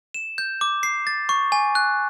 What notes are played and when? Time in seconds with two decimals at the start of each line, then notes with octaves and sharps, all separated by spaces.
0.14 E7
0.38 G6
0.61 D6
0.83 C7
1.07 A6
1.29 C#6
1.52 G#5
1.75 F#6